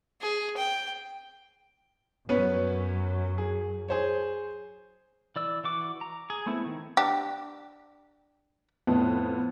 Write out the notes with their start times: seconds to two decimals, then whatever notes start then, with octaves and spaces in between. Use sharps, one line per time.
0.21 G#4
0.57 G5
2.29 F#2 F#3 B3 C#4 B4
3.38 G#4
3.88 G#4 C5 C#5
5.36 E3 D5 E6
5.64 E3 F#4 D6
6.01 A#5
6.30 G#4
6.46 A3 B3 C4 E4
6.66 D#3
6.97 D4 G4
8.87 F2 A2 B3